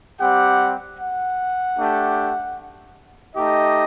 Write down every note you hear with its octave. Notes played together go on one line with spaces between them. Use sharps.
G3 C4 G4 F#5
F#5
A3 D4 G4
A3 D#4 G4 D#5